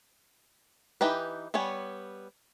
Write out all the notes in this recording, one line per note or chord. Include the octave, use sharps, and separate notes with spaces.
E3 D#4 G4 B4
G3 B3 C#5 G#5